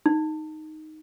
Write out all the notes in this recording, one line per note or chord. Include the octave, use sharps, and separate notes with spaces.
D#4